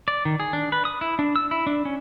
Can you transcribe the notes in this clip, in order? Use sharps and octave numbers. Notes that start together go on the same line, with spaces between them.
D5
D#3
G#4
D4
B4
D#6
E4
D4
E6
E4
D4
C#4